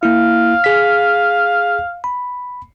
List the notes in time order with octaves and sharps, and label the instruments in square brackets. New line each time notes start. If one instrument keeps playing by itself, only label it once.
[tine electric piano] A#3 E4 [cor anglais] F5
[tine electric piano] G#4 B6
B5